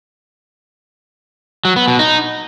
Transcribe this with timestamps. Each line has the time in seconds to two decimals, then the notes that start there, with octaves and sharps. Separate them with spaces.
1.65 F#3
1.76 B3
1.88 B2
1.99 D#4